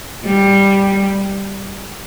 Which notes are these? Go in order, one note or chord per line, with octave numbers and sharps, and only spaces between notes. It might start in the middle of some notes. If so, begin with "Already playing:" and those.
G3